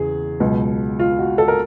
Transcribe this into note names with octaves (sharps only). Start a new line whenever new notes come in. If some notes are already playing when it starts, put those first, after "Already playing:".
Already playing: E2 C#3 E3 G#4
C#2 B2 F#3
F4
F#4
A4
A#4